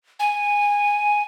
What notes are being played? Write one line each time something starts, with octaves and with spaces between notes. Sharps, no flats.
G#5